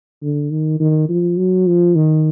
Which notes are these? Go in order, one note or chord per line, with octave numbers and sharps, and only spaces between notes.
D3
D#3
D#3
F3
F#3
F3
D#3